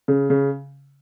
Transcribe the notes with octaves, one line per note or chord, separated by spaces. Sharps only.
C#3
C#3